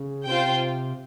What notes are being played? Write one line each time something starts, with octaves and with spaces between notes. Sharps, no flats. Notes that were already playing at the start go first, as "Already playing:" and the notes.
Already playing: C#3
C3 F4 C5 G5